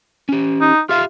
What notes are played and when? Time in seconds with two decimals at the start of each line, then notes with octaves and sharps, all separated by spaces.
0.29 C#4 G4
0.61 D#4
0.89 F4 G4 E5 F5